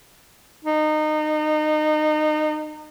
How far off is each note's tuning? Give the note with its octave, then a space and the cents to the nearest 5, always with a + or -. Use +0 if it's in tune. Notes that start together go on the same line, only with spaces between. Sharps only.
D#4 -25